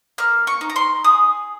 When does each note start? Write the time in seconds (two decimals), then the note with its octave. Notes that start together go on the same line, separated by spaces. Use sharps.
0.18 A#3 F6
0.47 C#6
0.61 D#4
0.70 A#5
0.76 C6
1.04 G#4 D#6